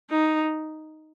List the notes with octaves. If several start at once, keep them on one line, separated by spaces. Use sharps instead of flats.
D#4